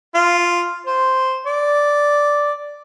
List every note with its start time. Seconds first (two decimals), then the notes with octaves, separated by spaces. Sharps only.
0.15 F4
0.87 C5
1.46 D5